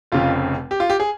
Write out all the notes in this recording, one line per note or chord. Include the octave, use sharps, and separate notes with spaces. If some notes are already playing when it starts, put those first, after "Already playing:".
F1 F2 C#3 F4
G4
F4
G4
G#4